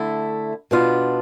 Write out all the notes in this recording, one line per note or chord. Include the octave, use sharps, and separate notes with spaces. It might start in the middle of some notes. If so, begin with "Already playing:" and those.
Already playing: D3 A3 E4
B2 B3 D4 F4